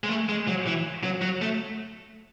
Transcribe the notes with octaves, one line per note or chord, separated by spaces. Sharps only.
G#3
A3
G#3
F#3
E3
F#3
F#3
A3